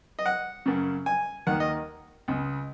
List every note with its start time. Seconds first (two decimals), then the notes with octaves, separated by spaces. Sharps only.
0.19 D#5
0.26 F#5
0.66 F#2 C#3
1.06 G#5
1.47 D#2 D#3 F#5
1.60 D#5
2.28 C#2 C#3